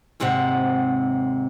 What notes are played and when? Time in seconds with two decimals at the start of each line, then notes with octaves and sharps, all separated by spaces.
0.20 D#2 G#2 C3 C4 F#5